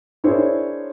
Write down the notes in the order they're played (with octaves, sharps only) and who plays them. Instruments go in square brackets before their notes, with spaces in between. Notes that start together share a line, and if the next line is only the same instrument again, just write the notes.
[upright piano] D4 E4 G#4 A#4 C5 C#5